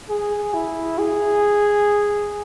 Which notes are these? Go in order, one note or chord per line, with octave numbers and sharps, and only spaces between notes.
G#4
E4
G#4